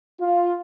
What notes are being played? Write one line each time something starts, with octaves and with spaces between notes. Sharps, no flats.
F4